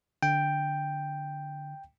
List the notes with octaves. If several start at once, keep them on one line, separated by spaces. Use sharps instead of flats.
D3 G5